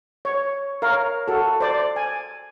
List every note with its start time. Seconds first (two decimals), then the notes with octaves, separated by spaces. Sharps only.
0.25 C#5
0.82 A#4 C#5 F5
1.28 F#4 A4
1.60 C5 D5
1.96 G#5